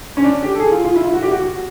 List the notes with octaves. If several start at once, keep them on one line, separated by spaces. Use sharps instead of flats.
C#4
D4
G4
A4
G#4
F4
F4
E4
F4
F#4
G4
F#4